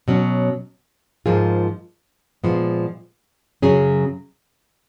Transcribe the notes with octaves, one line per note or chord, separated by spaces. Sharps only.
B2 F#3 C#4
G#2 F3 A#3 F4 G#4
A#2 F3 G#3 B3
F#2 C#3 F#3 C#4 G#4